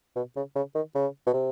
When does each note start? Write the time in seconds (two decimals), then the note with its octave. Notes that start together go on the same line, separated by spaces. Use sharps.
0.16 B2
0.36 C#3
0.56 C#3
0.75 D#3
0.95 C#3
1.27 B2
1.33 C3